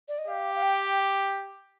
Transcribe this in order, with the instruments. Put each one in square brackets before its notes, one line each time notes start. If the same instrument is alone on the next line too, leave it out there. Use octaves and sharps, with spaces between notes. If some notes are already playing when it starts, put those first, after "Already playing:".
[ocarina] D5
D#5
[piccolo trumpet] G4 [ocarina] F5
[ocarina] F5
G5